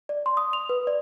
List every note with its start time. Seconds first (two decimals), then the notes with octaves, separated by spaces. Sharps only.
0.09 D5
0.26 C6
0.37 D#6
0.53 F7
0.69 B4
0.87 D5